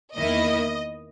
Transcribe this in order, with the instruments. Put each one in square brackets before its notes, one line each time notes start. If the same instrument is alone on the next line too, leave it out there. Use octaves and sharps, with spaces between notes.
[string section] E2 D#3 A#3 E4 D#5